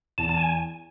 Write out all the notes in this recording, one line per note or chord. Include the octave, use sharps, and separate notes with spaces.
E2 A5
A5
G#5